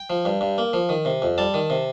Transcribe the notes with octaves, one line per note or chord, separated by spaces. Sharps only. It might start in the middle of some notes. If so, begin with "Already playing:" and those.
Already playing: G5
F3
G2
G2
A#3
F3
D#3
C3
F2
G3 A5
D#3
C3